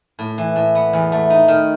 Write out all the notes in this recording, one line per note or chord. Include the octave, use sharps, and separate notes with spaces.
A2
E3
A2
B3
E2
A3
D#4
D#3